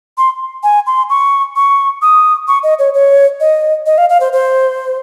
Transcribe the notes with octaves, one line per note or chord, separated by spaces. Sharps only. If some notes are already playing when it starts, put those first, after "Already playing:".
C6
G#5
C6
C#6
C#6
D#6
C#6
D#5
C#5
C#5
D#5
D#5
F5
F5
C5
C5